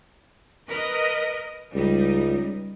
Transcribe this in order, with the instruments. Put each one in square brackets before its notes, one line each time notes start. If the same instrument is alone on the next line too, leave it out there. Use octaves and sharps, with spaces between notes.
[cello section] A#4 B4 D#5
[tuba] C#2 [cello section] G3 D#4